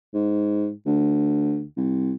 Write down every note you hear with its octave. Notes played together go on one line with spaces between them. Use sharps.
G#2
D2
C2